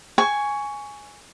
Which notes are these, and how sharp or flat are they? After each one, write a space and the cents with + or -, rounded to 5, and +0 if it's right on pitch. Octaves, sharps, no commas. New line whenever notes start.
G#5 +0 C#6 +15